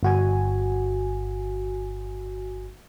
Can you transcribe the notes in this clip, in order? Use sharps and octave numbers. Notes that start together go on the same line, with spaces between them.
G1 F#4 G#5